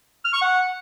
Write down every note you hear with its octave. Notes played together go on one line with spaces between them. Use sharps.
F6
C#6
F#5